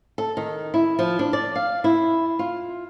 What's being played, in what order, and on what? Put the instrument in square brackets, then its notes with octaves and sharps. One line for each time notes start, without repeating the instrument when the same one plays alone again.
[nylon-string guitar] A4
D#3
E4
F3
D4
D5
F5
E4
F4